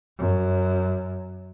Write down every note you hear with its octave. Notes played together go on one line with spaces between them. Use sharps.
F#2